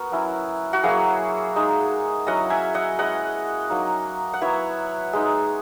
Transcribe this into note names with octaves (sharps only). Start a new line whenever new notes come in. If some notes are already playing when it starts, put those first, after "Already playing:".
Already playing: B3 F#4 A#4
F#3 C#4 E4
F#4
F#3 A#3 E4 G#4
G#3 D#4
F#3 C#4 E4 D#5 F#5
E5 G#5
D#5 F#5
G#3 C#4 E4 D#5 F#5
F#3 A#3 D#4
F#5
F#3 B3 E4 C#5 E5
G#3 D#4